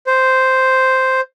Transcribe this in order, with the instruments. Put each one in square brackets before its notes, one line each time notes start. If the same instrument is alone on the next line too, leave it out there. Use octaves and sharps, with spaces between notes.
[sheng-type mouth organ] C5